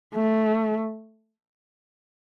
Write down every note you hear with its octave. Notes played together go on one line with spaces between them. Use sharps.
A3